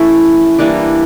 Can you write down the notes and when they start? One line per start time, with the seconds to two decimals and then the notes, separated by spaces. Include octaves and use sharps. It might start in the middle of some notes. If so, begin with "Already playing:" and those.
Already playing: E3 A3 C#4 E4
0.58 E3 G3 A#3 D4